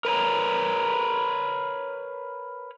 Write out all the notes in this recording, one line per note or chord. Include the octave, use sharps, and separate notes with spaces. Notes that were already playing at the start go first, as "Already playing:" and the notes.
A#4 B4 C#5 A#5